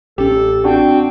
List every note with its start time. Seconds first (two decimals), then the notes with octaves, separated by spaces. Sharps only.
0.18 A1 C#4 G4 A4
0.64 C4 D4 F#4 G5